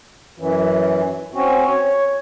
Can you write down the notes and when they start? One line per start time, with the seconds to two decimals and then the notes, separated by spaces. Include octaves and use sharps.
0.38 F#2 E3
1.35 C4 C#4 F#4
1.72 C#5